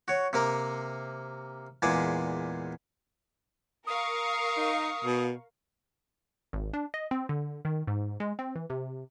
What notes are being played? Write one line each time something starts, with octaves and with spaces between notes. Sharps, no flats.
F#4 C#5
C3 A#3 A#4
E2 A#2 G#3 G#4 D5
A#4 F5 C#6 D#6
D#4
B2
G#1
D4
D#5
C4
D3
D#3
G#2
G#3
C4
E3
C3